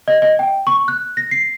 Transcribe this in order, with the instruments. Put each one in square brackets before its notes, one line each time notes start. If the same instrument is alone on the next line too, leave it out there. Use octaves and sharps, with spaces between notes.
[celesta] D#5
D#5
G5
C#6
F#6
A#6
C7